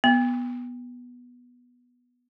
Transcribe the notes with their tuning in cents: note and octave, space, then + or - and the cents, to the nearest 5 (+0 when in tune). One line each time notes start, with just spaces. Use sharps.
B3 -10